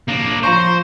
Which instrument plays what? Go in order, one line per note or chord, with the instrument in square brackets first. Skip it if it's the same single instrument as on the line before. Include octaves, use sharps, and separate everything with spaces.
[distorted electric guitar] A#3 D4
[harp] F3 A#5 C#6 [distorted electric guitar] C5